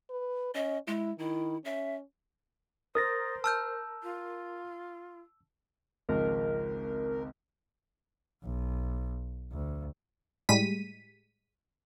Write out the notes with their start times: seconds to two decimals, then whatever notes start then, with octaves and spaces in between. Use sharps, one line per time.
0.10 B4
0.55 C#4 D#5
0.87 G#3 E4
1.19 D#3 E4
1.65 C#4 E5
2.95 A#4 C5 D#6 A6 A#6
3.44 A5 E6 F6 G6
4.03 F4
6.09 G#1 C#2 F3 A#4
8.43 B1
9.52 D2
10.49 A2 G3 G#3 B6 D#7